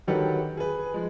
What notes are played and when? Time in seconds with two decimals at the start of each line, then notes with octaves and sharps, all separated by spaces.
0.07 D3 D#3 F#3 G4 A4 B4
0.57 G#4 B4
0.94 F3 G#3